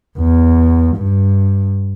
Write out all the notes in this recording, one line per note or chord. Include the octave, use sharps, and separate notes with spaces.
E2
G2